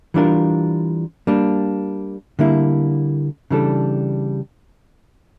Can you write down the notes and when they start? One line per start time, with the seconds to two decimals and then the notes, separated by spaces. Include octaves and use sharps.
0.14 E3 G3 D4 F4 A#4
1.27 G3 A#3 D4
2.39 D3 G3 A#3 E4
3.50 C#3 E3 G3 D4 A4